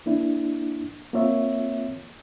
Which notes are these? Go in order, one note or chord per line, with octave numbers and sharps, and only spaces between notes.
A#3 D4 E4
A#3 C4 F4 C#5 E5